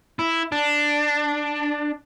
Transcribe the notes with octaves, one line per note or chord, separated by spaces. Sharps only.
E4
D4